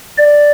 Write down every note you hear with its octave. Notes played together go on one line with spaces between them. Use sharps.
D5